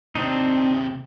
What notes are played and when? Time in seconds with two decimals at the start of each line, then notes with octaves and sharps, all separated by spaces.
0.15 D#2 C3 C4 D4 D#4